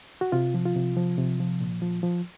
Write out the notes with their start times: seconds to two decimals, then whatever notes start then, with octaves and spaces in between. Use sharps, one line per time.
0.21 F#4
0.32 C3 F4
0.54 F3
0.65 F4
0.75 C3
0.97 F3
1.18 C3
1.40 F3
1.60 A#2
1.82 F3
2.03 F3